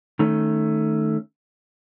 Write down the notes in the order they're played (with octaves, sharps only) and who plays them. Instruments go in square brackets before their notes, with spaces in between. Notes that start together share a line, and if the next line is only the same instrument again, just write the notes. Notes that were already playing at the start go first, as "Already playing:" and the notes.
[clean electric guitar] D#3 A3 C#4